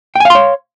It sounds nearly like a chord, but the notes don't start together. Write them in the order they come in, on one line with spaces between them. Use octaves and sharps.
G5 G#5 F5 C6 C#5